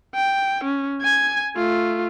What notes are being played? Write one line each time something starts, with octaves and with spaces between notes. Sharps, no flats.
G5
C#4
G#5 G#6
A3 F4